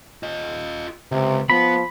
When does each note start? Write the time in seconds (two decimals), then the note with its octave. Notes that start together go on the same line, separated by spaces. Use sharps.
0.23 F4 D#5
1.12 C#2 C3
1.50 F3 B3 B5